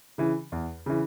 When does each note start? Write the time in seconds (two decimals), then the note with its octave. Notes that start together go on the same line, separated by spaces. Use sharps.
0.18 C#3 E3
0.52 E2
0.86 C#3 E3